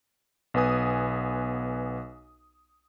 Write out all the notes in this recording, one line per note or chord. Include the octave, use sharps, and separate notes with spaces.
B1 B3 B4 G#5 D#6